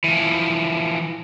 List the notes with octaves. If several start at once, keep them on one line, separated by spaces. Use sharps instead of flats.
E3 F3